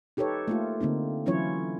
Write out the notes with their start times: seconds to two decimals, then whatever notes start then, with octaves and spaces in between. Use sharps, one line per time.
0.17 D#4 G4 A4 B4 C#5
0.48 A3 A#3 F4
0.81 D3 A#3 C4 D#4
1.26 E3 F#3 C#4 E4 F4 C#5